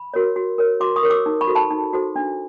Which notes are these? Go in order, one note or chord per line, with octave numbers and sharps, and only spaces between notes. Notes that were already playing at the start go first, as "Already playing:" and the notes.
Already playing: B5
F#4 A#4 C#5
F#4
A#4 C#5
F#4 C6 D6
C#6 D#6
A#4 C#5
D6 E6
D#4
B5 C#6
F#4 A4 C5
A5 B5
D#4
F#4 A4 C5
D4